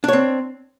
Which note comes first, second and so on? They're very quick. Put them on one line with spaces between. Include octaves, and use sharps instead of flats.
D4 C#5 C4